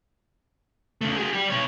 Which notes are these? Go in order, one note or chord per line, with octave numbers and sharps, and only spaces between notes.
C#3 A3
F#4 G#4
G3 G4
B2 C#5